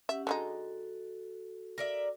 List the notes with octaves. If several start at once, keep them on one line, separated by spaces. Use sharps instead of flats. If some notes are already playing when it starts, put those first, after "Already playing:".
C#4 G4 E5 F#5
D3 G#3 D#4 F#4 A4
A#4 D5 E5